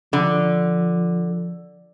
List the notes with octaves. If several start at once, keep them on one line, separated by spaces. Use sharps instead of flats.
D3 F3